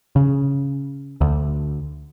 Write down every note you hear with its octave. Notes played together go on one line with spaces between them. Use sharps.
C#3
D2